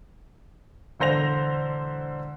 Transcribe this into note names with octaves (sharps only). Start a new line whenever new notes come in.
E1 D3 C5 A#6 F7